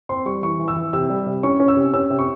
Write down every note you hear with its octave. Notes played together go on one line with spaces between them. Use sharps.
C4 C6
G3 C#6
E3 C#6
E3
E6
E3
C3 E6
G3
C3
C#4 C#6
C#4
E6
C3
C#4 E6
C3
C#6